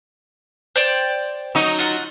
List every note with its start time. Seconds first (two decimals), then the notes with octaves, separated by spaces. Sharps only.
0.76 C5 D5 G5
1.55 F#3 D#4
1.79 F4 F#5